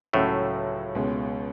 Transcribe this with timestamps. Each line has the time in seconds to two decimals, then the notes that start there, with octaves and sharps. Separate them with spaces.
0.13 C#2 A2 C#3 F#3 A3 C#4 F#4
0.95 C#2 B2 G#3 C#4